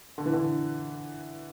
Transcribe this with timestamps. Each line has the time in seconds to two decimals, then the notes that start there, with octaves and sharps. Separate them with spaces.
0.18 D3
0.26 E3
0.33 D3